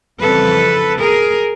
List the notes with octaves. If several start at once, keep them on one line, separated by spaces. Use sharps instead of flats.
F2 C#3 E3 G3 A4 B4
G#4 A#4